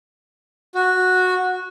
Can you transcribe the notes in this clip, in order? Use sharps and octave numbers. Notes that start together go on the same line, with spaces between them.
F#4